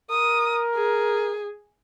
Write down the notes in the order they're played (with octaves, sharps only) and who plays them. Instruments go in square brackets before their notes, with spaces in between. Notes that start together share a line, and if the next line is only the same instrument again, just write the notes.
[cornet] A#4 [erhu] D#6
[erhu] G#4